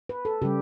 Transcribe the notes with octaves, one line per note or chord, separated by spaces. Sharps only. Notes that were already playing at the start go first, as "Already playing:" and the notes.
B4
A4
C#3 G3 G4